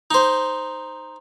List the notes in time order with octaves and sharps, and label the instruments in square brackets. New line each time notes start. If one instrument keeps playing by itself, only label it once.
[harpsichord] D#4 C5